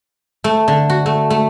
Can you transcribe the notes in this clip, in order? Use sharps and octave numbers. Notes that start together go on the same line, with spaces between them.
A3
D3
F#4
A3
A3